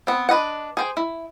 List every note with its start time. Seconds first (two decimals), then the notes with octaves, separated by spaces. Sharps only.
0.07 B3 C4
0.29 D4 B4 D#5 F#5
0.77 G#4 C5 G5
0.97 E4